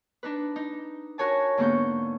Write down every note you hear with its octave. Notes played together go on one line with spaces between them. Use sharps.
D4 D#4 B4
D#4
F#4 A#4 C#5 G#5 A5
G#2 D3 A#3 B3 C#6 G6